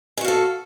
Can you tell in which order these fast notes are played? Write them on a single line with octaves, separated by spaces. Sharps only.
G#4 F#4 F5 A4